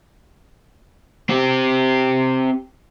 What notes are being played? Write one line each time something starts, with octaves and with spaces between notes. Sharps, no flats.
C4 G4